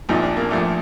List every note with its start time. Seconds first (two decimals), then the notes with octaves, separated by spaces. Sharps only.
0.09 A#1 A#2 F3 D#4
0.23 D4
0.37 A#3
0.51 A#1 A#2 F3 A3